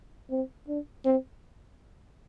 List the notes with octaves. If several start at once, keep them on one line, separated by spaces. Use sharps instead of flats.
C4
D4
C4